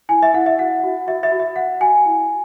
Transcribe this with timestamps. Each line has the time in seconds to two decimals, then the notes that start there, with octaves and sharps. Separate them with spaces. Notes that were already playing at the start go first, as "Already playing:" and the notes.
0.09 E4 G#5
0.23 E5
0.34 E4 F#5
0.46 E5
0.59 F#4 F#5
0.83 F#4
1.07 F#4 E5
1.23 E5
1.32 F#4
1.39 E5
1.56 F#4 F#5
1.80 F#4 G#5
2.06 E4